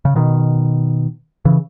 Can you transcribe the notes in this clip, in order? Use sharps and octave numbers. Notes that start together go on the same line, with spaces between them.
C#3
B2 D#3
C#3 E3